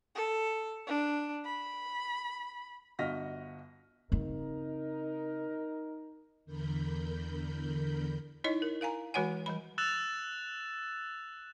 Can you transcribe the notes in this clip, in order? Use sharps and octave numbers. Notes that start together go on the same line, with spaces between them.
A4
D4
B5
G1 F#4 D#5 F6 A#6 B6
C#3 C4 D#4 A#4
E2 D3 A#4 B5 G6
D#4 E4 C#5 D#5
A#4
A#4 F5 G#5 A#5
E3 G#3 F#4 C#5 F#5 G#5
E3 G3 B5
E6 F#6 A6 E7 F7